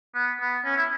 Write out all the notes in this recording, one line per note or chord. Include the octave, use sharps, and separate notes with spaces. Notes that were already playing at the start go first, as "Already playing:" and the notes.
B3
B3
C#4
E4